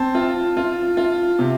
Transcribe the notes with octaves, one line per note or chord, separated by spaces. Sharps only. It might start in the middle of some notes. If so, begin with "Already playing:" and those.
Already playing: C4 A5
F4
F4
F4
C3